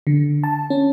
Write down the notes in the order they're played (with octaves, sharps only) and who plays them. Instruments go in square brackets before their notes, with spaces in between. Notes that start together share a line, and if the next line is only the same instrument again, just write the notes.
[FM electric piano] D3
A5
C#4